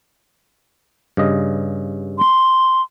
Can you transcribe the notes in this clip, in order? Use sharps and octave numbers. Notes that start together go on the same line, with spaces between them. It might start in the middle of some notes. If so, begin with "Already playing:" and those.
G2 C#3 D#5
C6